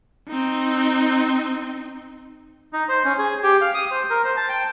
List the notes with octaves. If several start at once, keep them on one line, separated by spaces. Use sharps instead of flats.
C4 D#4
D#4
C5
C#4
G#4
G4
F5
D#6
C5
A#4
C5
A5
G5